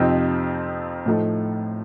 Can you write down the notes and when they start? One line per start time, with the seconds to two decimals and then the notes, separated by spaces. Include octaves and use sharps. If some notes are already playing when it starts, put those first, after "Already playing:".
Already playing: F2 C3 F3 C4 D#4
1.06 A2 F3 A3 D#4